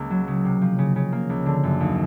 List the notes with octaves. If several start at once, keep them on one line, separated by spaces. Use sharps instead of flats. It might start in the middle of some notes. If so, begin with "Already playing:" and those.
Already playing: C#2 A#3
F#3
C#3
C3
F3
C#3
C#3
A#3
C#2
D3
F#2
D#2